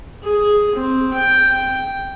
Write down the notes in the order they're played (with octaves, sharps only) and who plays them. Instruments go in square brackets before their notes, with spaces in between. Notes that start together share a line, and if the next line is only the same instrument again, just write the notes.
[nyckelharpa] G#4
C4
G5